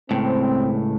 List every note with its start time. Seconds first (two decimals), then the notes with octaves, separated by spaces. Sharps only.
0.11 C#2 A2 C4